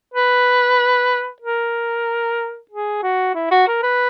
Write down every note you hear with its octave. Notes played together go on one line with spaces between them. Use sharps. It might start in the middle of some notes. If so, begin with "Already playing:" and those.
B4
A#4
G#4
F#4
E4
F#4
A#4
B4